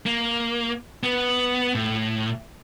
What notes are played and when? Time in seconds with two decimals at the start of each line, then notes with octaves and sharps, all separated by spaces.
0.06 A#3
1.03 B3
1.75 A2